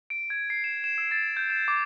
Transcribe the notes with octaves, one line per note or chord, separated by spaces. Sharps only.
D7
G#6
C7
E7
E7
E6
A6
G6
E7
D6